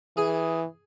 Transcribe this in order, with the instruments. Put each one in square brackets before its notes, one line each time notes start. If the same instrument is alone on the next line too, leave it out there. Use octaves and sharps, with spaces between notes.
[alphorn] E3 [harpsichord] G#4